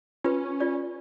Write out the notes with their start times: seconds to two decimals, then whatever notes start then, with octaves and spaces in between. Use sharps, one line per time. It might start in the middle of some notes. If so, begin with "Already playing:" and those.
0.24 C#4 F4 B4
0.60 F4 D5